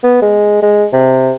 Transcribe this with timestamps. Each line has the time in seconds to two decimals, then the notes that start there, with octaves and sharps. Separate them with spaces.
0.04 B3
0.22 G#3
0.63 G#3
0.93 C3